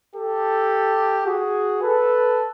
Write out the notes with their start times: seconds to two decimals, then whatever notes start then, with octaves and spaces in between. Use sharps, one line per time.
0.16 G4 A4
1.26 F#4 G#4
1.81 A4 B4